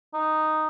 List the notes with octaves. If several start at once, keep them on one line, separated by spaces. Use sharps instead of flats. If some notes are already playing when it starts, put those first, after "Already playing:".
D#4